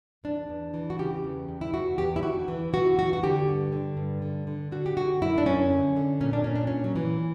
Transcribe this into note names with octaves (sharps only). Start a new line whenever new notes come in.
E2 D4
E2
E3
F#4
C#3 G4
E2
E2
E4
E2 F#4
E2 G4
E4
E2 F#4
E3
E3 F#4
E2 F#4
F#4
D3 G4
G2
D3
G2
D3
D3
D3 F#4
G4
D3 F#4
F#2 E4
D4
F#2 C#4
D3
D3
A#2 C#4
D4
A#2 C#4
D4
A#2 C#4
F#3
A#2 E3